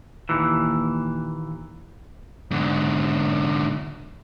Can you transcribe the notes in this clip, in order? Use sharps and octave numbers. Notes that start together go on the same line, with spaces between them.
D#2 A#2 E3
G#2 D3